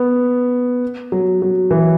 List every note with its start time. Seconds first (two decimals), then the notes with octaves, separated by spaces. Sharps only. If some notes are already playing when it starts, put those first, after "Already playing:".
Already playing: B3
1.12 F#3
1.42 F#3
1.71 E3